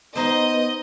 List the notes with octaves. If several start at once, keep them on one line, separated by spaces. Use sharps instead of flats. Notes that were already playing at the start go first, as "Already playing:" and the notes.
B3 D#4 C5 D#5